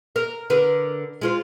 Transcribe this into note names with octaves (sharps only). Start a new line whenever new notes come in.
A#4
D3 A#4 B4
G#3 F4 C5